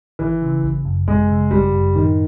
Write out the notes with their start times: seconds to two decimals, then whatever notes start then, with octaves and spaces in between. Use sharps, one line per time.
0.19 G#1 E3
0.42 C#3
0.64 G#1
0.85 F#2
1.08 G#1 G#3
1.29 C#3
1.51 G#1 G3
1.73 F#2
1.95 A2 D#3